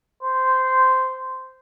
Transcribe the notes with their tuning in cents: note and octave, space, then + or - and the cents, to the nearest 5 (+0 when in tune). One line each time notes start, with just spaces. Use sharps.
C5 -10